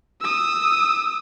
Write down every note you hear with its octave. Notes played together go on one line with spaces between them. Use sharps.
D#6 E6